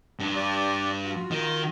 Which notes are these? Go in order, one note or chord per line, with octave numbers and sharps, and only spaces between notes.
G2
G4 D5
F4 F#4
D#3